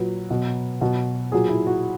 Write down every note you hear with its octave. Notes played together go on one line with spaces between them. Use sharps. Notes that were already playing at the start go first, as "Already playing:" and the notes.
Already playing: A#2 F#3 B4
B2 F#3
B2 F#3
A#2 F#3 G#4
E4
F#4